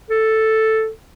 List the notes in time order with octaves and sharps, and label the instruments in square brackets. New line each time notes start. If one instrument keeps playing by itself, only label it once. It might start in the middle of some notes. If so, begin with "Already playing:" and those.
[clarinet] A4